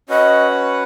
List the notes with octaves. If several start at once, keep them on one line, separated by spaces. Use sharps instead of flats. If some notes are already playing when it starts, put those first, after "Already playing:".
C#4 F#4 B4 D#5 F#5